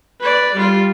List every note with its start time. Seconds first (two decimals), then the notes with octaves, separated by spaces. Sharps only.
0.21 B4 D5
0.55 G3 F4